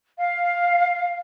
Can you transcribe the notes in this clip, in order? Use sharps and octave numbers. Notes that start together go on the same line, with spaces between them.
F5